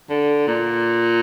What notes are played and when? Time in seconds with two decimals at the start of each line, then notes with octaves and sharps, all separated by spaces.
0.09 D3
0.47 A#2